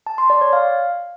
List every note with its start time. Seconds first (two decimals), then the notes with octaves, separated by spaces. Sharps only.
0.07 A5
0.18 C6
0.30 D5
0.41 C#5
0.53 F5